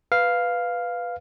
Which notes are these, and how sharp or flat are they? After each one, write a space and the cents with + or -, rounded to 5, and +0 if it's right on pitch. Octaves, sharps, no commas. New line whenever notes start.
B4 +0 F5 +0